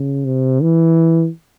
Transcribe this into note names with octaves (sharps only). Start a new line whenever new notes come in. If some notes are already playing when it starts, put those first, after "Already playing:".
Already playing: C#3
C3
E3